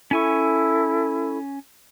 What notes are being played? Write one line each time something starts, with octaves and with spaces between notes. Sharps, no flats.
C#4 E4 A4 G#5 C#6